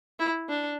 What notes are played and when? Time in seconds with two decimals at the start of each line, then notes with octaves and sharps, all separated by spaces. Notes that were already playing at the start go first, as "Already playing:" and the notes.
0.19 E4
0.49 D4